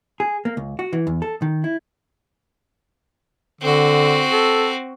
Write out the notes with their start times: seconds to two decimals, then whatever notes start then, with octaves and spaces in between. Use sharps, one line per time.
0.20 G#4
0.45 A#3
0.57 C#2
0.79 F#4
0.93 E3
1.07 E2
1.22 A4
1.42 D#3
1.64 E4
3.61 D3 C4 F#4
4.32 A4